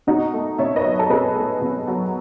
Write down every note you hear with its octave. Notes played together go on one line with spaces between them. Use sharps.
B2 D#4 F#4
A3
B2 C#5 E5
B4 D#5
F#3
A4
B2 G#4 B4
A3
B2
F#3